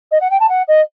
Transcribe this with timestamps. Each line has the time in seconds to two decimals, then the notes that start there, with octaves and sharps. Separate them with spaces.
0.11 D#5
0.21 F#5
0.30 G5
0.40 A5
0.49 F#5
0.68 D#5